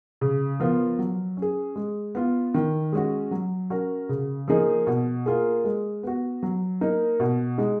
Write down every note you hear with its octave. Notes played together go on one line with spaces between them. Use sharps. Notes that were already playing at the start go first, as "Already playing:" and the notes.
C#3
F3 B3 F4 A#4
F#3
C#4
G#4
G#3
B3 F4
D#3
G#3 C#4 F#4
F#3
C#4 F#4 A#4
C#3
F3 A#3 D#4 G#4
B2
A#3 F4 G#4
G#3
B3 F#4
F#3
A#3 D#4 A#4
B2
G#3 D#4